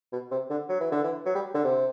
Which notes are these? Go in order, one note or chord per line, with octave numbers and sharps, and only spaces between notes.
B2
C3
D3
F#3
E3
D3
E3
F#3
G3
D3
C3